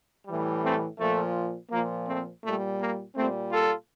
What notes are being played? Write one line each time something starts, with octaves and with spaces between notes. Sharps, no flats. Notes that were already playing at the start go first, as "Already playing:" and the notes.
A2 E3 G3
A3 C4
A#2 F3 A3
A#2 F3 A#3
A3 C4
A#2 G3 A3
A#3
A#2 G3 A3 C4
F4 A4